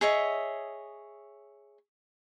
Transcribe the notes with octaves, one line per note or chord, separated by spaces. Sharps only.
G#4 C#5 D#5 E5